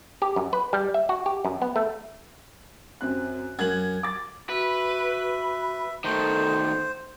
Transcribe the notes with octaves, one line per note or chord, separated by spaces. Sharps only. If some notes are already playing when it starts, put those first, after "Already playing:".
G4
F#2
B4
G3
E5
F#4
G4
F#2
B3
A3
F#2 C4 F#6
F#2 G#6 F#7
D6 A6
F#4 B4 E5
D#3 A3 A4 C5